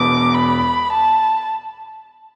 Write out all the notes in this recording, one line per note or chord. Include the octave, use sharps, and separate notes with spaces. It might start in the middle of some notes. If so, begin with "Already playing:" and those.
Already playing: E1 E2 B2 B3 D6
B5
A5